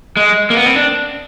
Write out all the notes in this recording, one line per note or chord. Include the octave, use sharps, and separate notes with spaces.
G#3
A#3
B3
C4
D4